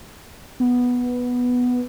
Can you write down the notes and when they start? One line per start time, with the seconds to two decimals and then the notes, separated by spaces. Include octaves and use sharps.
0.60 B3